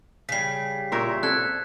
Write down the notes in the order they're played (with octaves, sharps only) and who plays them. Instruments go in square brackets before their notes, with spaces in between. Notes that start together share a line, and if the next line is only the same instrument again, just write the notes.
[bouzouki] C#3 G3 [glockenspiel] B6 C7
[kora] A#2 A#4 E5 [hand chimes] C6 C#6
[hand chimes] C4 G#6 B6 [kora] A4 [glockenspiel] F#6